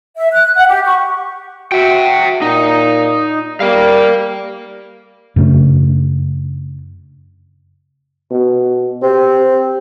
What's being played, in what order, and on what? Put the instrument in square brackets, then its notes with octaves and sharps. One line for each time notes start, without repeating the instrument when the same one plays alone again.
[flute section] E5
F#6
F#5
G4
C#6
[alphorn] F#4 [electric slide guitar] E5 G5
[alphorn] A#2 [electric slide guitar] D#4
[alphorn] G3 [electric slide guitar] A#4 F5
[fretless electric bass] F#2 C#3 A3 D4
[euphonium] B2
[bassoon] C4 [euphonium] G4